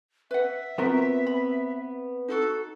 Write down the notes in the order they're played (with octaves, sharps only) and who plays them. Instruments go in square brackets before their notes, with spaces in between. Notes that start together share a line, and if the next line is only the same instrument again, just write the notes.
[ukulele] B4 F#5 [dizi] E5
[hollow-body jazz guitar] B3 C4 A#4 [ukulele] F4 F#4
[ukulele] B5
[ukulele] D#4 F4 F#4 [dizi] A4